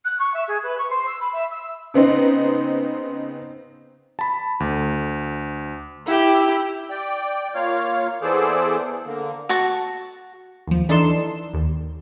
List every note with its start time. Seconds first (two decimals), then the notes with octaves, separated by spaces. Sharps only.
0.05 F#6
0.19 C#6
0.34 E5
0.48 G#4
0.63 B4
0.78 C#6
0.90 C5
1.06 E6
1.21 B5
1.33 E5
1.51 E6
1.94 C#3 B3 C4 D#4
4.19 A5 B5
4.60 D2
6.06 E4 G4
6.89 D5 G5
7.55 A#3 F4 C#5 F5 F6
8.22 E3 B3 G#4 A4 C5 D5
9.06 D3 A#3
9.49 F#4 A5 C#6
10.67 D#2 F3
10.89 E3 D4 D#4 A4 C6 E7
11.54 D#2